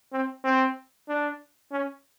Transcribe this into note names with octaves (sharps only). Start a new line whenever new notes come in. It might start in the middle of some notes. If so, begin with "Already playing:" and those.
C4
C4
D4
C#4